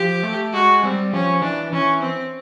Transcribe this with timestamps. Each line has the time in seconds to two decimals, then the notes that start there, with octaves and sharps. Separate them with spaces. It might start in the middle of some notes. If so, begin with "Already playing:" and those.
Already playing: F3 G4
0.23 A3
0.53 G#3 F#4
0.83 G3 C4
1.13 F3 C#4
1.42 E3 D4
1.72 E3 C#4
2.01 C4